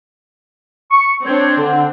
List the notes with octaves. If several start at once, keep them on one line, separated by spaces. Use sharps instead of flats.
C#6
C4 D4 C#5
D3